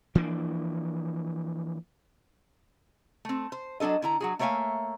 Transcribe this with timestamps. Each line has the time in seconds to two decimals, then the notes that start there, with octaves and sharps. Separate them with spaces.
0.15 E3 F3 A#3 D4
3.25 A3 C4
3.52 C5
3.80 F#3 A3 D4 A4 D#5
4.02 D3 E4 A#5
4.20 F#3 F#4 G#4
4.39 A3 A#3 C#5 E5 F5 G#5